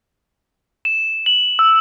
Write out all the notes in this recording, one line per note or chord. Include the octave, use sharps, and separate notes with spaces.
E7
F#7
E6